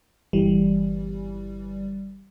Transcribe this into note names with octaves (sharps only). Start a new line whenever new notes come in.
G1 E3 G3